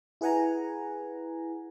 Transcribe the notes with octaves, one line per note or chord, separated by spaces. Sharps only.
E4 G#4 B4 F#5 G#5 A#5